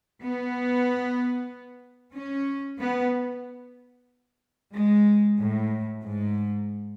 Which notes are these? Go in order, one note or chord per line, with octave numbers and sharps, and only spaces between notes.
B3
C#4
B3
G#3
A2
G#2